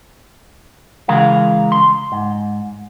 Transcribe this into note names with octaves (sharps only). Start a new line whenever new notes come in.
C#3 E3 G#3 A#4 F5
C6
G#2